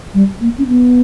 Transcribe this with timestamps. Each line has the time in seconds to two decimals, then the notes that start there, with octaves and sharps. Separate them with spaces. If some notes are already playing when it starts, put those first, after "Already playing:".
0.14 G3
0.41 A#3
0.58 C#4
0.68 B3